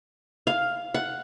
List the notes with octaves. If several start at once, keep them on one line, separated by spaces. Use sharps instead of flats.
F5
F#5